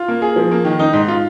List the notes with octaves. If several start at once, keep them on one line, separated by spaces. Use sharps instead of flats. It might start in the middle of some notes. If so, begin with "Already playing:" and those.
Already playing: F4
A#3
G#4
F3
A#3
D#3
D#4
G#2
F4